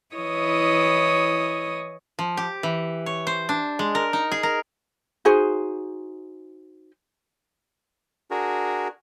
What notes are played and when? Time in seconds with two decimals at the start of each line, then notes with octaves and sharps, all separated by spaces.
0.16 E3 E4 C#5 D#5 D#6
2.19 F3
2.37 G4
2.63 E3
3.06 C#5
3.27 C5
3.49 D4
3.79 G#3
3.95 A#4
4.13 D#4
4.32 G#4
4.43 A#4
5.25 D#4 F#4 G#4 C5
8.31 D4 F#4 G#4 A#4